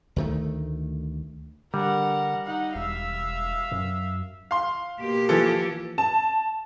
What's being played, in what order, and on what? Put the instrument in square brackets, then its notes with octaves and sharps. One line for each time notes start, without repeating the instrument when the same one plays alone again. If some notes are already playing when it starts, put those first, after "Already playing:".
[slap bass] D2 D#3 A3
[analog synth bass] D3 [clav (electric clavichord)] G3 [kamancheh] A#4 F#5
[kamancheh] D#4 F#5
[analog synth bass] E1 [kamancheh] E5 F5
[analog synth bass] F#2
[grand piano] F5 C6
[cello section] B2 A#3 G4
[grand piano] E3 F3 A4
[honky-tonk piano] A5